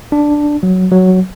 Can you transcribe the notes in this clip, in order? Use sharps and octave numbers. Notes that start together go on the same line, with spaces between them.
D4
F#3
F#3